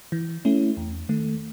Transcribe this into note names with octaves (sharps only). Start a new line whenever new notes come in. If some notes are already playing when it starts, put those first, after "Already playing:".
E3
A3 C#4 E4
E2
D#3 A3